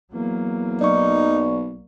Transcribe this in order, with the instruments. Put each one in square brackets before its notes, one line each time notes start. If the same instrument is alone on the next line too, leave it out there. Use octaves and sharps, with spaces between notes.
[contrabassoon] E2 [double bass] F#3 A#3
[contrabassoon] B1 [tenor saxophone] D#4 [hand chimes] D5 C#6